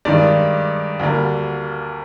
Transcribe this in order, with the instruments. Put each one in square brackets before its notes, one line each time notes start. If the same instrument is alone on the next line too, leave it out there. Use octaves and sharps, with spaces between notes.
[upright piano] G2 D#3 G#3 [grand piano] D5
[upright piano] D2 D3 G3 A#3